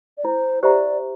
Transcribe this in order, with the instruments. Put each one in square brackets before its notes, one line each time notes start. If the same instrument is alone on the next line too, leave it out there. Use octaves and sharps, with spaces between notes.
[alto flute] D5
[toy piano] E4 [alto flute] C5
[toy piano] G4 C5 E5 A#5 [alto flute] D5